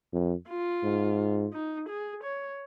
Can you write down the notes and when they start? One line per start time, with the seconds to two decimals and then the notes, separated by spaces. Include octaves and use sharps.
0.13 F2
0.49 F4
0.84 G#2
1.53 D#4
1.89 G#4
2.24 C#5